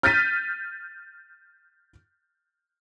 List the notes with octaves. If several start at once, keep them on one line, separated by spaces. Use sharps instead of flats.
F6 G6 A6 B6 D#7